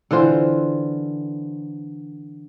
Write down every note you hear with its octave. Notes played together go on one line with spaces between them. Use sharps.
D3 E3 F4 C5